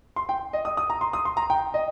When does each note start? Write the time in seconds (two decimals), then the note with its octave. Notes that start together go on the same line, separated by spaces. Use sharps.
0.16 C6
0.29 G5
0.53 D#5
0.65 D#6
0.77 D#6
0.90 A#5
1.01 C6
1.13 D#6
1.25 C6
1.37 A#5
1.50 G5
1.74 D#5